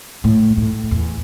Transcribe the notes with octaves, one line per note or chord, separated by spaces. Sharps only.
A2
A2
E2